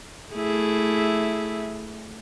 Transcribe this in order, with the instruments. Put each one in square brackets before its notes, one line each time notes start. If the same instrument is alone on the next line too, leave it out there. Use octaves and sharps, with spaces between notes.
[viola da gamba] A3 E4 G#4